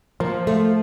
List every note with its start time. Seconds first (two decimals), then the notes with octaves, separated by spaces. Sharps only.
0.20 F3 A#3
0.47 A3